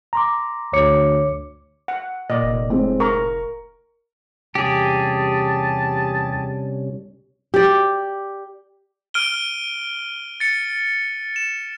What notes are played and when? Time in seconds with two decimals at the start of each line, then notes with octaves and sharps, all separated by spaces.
0.13 A#5 C6 D6
0.73 D2 C#5 D6 C#7
1.88 F#5
2.30 A#2 D5 D#5
2.43 F1
2.70 A2 G#3 C4
3.00 A#4 A#5 C#6
4.55 E2 C3 G3 C#4 G4 G#4 A5
7.54 G4 D5
9.14 F6 D7 D#7 G7
10.40 A6 C#7
11.36 E7